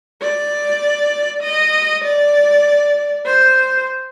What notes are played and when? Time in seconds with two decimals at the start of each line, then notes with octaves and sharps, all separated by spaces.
0.21 D5
1.43 D#5
2.04 D5
3.26 C5